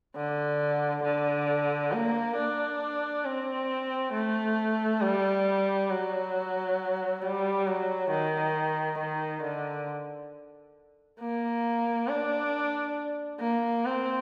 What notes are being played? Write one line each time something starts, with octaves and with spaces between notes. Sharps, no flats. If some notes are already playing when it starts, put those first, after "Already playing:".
D3
D3
A#3
D4
C4
A3
G3
F#3
G3
F#3
D#3
D#3
D3
A#3
D4
A#3
C4